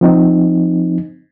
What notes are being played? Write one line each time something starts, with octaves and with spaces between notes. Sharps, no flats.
F3 C4 D#4